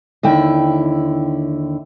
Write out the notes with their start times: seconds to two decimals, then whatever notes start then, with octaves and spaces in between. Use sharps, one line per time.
0.23 D#2 D3 E4 G5